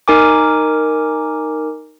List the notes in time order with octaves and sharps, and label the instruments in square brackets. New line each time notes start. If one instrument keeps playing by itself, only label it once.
[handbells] D#4 A#4 G#5 D6